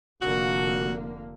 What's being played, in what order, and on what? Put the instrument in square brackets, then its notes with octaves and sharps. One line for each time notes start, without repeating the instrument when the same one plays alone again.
[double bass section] F1 D3 A#3 [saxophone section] F#4